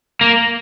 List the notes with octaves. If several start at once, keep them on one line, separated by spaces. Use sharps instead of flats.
A#3